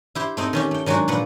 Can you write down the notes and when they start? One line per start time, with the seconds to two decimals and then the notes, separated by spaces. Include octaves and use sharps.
0.15 E4 G4 C5
0.37 A3 C4 D#4 D#5
0.53 D#3 C#4 G4
0.71 A3 G5
0.86 D#3 F#3 G#3 D4 F#4
1.08 A#2 F3 B4 F#5